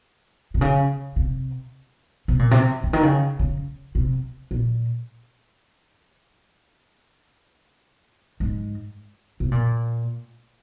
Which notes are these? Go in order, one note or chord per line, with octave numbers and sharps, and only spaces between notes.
C3
C#3
C3
C3
A#2
C3
C#3
D#3
C#3
C#3
C3
A#2
G#2
C3
A#2